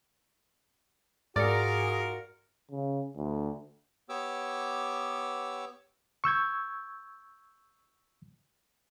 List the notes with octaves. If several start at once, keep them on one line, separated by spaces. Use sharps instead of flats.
G#2 F4 F#4 G#4 A#4 D5 C#7
C#3
D2
B3 G4 C#5 D6 E6
C#6 E6 G6 G#6